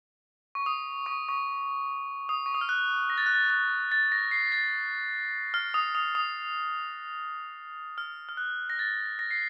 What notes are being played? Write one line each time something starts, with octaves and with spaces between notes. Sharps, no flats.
C#6
D#6
C#6
C#6
D#6
C#6
D#6
F6
F#6
A#6
A6
F#6
A6
F#6
A6
A#6
C7
A6
F6
D#6
D#6
D#6
F6
F6
F#6
A#6
A6
A#6
C7